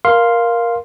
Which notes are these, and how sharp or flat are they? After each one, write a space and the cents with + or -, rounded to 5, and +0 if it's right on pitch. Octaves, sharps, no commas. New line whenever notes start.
A#4 +10 F5 +0 C6 +0